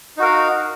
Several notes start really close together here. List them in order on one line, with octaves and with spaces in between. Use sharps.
D#4 F#4 A#4 F5